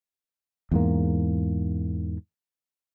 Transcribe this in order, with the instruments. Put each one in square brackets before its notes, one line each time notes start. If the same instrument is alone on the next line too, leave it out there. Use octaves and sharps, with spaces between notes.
[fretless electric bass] E2 G#2 A#3